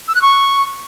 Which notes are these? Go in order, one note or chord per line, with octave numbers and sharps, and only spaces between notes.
E6
F#6
C#6